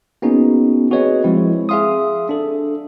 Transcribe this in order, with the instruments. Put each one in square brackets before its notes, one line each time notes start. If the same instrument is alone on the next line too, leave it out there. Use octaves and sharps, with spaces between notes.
[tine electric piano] A#3 B3 C#4 D#4 F#4 G#4
C4 F#4 G#4 B4 C#5 D#5
F3 G#3 C4 E4
G#4 E5 F5 C6 D#6
D4 A4